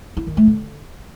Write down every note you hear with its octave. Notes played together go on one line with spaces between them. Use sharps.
E4
D#3
A3
D3